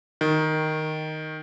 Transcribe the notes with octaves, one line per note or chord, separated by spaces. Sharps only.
D#3